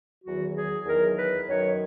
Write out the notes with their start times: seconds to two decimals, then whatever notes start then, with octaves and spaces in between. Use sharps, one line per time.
0.24 E2 D#3 F#3 F#4
0.56 G#4
0.86 E2 D#3 F#3 A#4
1.18 B4
1.48 F#2 D#3 F#3 C#5